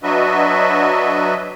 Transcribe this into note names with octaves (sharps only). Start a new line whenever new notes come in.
F#3 D4 F#4 B4 D#5 E5